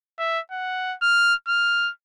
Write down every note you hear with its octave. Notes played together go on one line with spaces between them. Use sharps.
E5
F#5
F6
F6